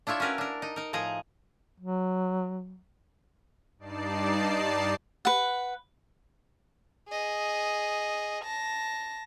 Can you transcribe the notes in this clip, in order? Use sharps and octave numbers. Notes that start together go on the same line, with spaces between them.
D4 E4 F4 C#5 E5
C#4 F#4 A#4 B4 C#5
D4 A#4
D#4
D#4 A#4
A2 F3 D#4 G#4 A#5
F#3
G2 D#4 D5 A5 C7
B4 F#5
G#4 D#5
A5 A#6